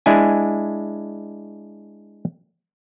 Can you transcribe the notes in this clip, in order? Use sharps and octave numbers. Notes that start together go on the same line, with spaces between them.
G#3 D4 E4 G#5